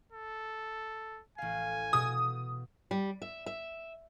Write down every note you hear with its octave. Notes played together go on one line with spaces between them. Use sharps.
A4
A1 F5 G#5
B2 D#6
G3
E5
E5